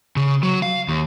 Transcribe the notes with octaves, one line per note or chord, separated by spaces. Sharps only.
C#3
F#3
F5
D#2